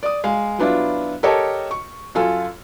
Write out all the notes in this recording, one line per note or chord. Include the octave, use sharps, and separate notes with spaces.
D5 D#6
G#3 F5
F#3 B3 D4 E4 F4
G4 A4 A#4 C#5 D#5 A5
C#6
F#2 F4 A4 G#5